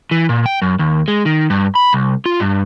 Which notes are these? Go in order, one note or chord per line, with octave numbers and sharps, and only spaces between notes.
E3
A#2
G5
F#2
D#2
G#3
D#3
G2
B5
C2
F4
G2